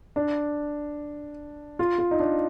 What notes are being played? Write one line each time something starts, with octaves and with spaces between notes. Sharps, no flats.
D4
F4
F4
D#4
D4